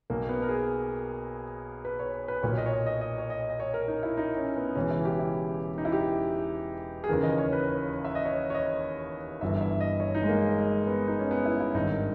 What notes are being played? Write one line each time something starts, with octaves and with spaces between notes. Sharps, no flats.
B1 B2 A#3
B3
A#4
G#4
B4
C#5
B4
B1 A#2 C#5
D#5
C#5
D#5
D#5
D#5
C#5
D#5
D#5
C#5
A#4
D#4
E4
D#4
C#4
B3
E1 E2 C#3 E3 C#4
E4
G4
E4
D#4
E4
G4
G#4
D#2 C#3 E3 A#4
D#5
C#5
B4
E5
D#5
C#5
C#5
D#5
G1 G2 E3 E5
E5
D#5
C#5
D#4
G#3
A#3
G#3
B3
D#4
C#4
B3
E4
E4
G#1 G2 D#3 D#4